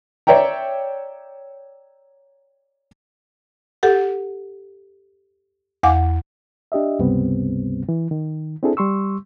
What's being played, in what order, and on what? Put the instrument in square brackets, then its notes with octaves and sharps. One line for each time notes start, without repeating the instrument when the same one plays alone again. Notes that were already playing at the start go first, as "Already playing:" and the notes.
[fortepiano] C#5 D5 E5 G5 A#5
[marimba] G4 A4 F#5
E2 F5 F#5 D6
[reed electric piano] D4 G4 D#5 E5
C#2 G2 C3 G3 B3 C4
E3
D#3
C4 D4 E4 G#4 A4
G3 C6 C#6 E6